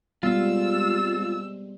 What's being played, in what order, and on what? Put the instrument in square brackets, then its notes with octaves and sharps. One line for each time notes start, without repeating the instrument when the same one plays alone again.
[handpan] G3 B3 [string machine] G#3 C4 [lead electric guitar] F4 [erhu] E6